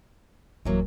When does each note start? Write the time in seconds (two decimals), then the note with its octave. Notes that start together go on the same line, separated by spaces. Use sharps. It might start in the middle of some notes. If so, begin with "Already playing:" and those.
0.65 D1 E3 F#3 A3 A#3